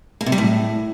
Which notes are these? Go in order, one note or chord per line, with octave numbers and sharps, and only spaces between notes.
A#3
C3
G3
A2